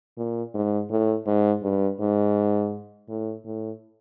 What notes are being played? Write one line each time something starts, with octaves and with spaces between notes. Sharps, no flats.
A#2
G#2
A2
G#2
G2
G#2
A2
A2